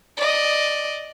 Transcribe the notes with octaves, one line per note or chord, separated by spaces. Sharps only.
D5 D#5